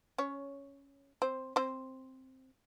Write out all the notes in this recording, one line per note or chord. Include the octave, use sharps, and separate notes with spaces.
C#4 C#5
C4 C5
C4 C5